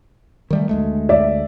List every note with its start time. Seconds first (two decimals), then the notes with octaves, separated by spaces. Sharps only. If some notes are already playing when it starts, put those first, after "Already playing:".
0.50 D#3 G3 A3
0.69 D2 G#3 A3
1.09 D5 E5